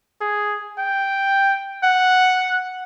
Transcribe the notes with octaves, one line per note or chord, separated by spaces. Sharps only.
G#4
G5
F#5